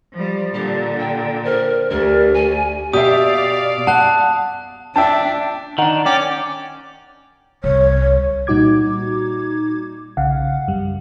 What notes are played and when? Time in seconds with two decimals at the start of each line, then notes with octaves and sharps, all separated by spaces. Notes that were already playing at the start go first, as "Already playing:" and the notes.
0.13 F3 G3
0.54 A#2 D3 G4
0.99 G5
1.45 A#4 C5
1.91 D2 G4 A#4
2.35 G#5
2.93 B2 G4 D5 E5 F5 D#6
3.87 F#5 A5 F#6
4.96 D4 E5 G5 A5
5.78 D#3 D4 D#5 F#5 A#5
6.06 C#4 D5 G5 D6
7.64 C2 C#5
8.47 A#2 G3 D#4 F#4 D6 G#6
10.17 B1 C#3 F5 F#5
10.68 F#2 G3